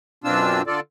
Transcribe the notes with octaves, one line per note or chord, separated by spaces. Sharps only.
F#2 B2 C4 D4 F4 E6
D3 F4 A4 D5